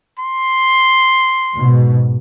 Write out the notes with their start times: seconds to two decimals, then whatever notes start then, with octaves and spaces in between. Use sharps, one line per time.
0.19 C6
1.55 G#2 B2